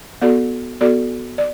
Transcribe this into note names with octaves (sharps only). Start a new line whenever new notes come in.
B3 F#4 A4 D5
B3 F#4 A4 D5
D5